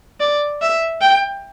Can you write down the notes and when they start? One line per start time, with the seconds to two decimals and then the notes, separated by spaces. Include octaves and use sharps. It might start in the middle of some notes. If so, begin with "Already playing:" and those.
0.20 D5
0.61 E5
1.02 G5